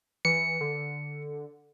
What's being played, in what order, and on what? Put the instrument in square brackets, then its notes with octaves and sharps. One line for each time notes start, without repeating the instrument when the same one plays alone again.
[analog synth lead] E3 [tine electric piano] C#7
[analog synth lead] D3